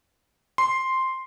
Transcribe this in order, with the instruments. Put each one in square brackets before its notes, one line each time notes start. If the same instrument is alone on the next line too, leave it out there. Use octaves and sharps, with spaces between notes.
[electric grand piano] C6